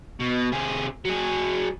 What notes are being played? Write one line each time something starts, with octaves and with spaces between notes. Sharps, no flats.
B2
C3 G#4
F#3 G#4